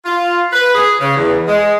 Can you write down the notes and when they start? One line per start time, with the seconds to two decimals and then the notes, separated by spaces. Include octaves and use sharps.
0.05 F4
0.53 B4
0.75 G#4
1.00 C#3
1.17 E2
1.47 G#3